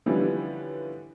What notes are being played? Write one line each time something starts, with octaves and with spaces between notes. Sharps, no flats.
D3 E3 F3 G3 B3 C#4